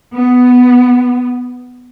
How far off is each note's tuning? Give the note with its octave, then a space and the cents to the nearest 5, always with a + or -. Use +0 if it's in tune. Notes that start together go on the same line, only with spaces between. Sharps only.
B3 +5